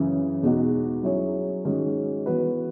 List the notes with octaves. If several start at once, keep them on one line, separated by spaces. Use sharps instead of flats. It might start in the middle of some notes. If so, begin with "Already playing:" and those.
Already playing: F#2 C#3 E3
E2 B2 G#3 D#4 F#4
F#3 C#4 E4 G#4 C#5
G#2 D#3 G#3 C#4 F#4
E3 B3 F#4 B4